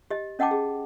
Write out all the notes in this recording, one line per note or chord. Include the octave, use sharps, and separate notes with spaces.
G4 D#5
C#4 D#5 F#5 G5 A5 D6
G#4